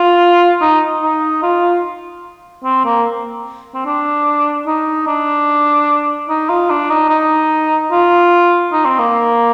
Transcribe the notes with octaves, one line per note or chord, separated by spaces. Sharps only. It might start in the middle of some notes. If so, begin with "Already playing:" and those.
Already playing: F4
D#4
D#4
F4
C4
A#3
C4
D4
D#4
D4
D#4
F4
D4
D#4
D#4
F4
D#4
C4
A#3